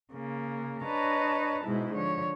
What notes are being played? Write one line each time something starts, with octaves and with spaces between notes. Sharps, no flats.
C#3 A#3
D4 B4 C#5 D#5 A5 A#5
G#2 B2 G#3 E4
D3 F3 C#5